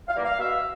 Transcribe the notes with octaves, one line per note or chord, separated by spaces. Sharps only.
F5
E3 G3 A#3
F5
B2 E5